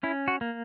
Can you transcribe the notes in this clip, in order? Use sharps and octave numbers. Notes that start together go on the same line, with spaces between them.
C#4 E4
F#4
A#3